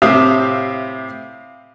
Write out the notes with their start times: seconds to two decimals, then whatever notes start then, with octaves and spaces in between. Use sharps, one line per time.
0.02 A2 C3 G4 E5 F5 D#6